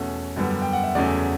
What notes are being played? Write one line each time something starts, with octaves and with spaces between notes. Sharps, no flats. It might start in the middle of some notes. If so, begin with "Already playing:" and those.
Already playing: E2 B2 A3 C#4
F#2 D3 G3 B3
G5
F#5
E5
E2 C#3 F#3 A3 C#4 D5